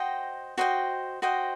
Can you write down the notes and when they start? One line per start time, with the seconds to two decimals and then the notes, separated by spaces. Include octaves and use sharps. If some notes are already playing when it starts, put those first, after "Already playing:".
Already playing: F#4 C5 D#5 G5
0.57 F#4 C5 D#5 G5
1.22 F#4 C5 D#5 G5